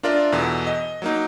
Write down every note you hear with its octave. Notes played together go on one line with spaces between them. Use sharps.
D4 F4 A#4 D5 E5
E2 B2 E3 A4
D#5
F#3 A#3 D#4